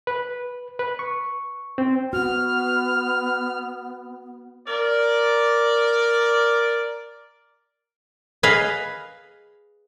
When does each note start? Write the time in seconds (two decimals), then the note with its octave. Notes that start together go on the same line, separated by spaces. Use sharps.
0.07 B4
0.79 B4
0.99 C#6
1.78 C4
2.13 B3 F#4 F6
4.67 A#4 D5
8.43 G#4 B4 D#5 F5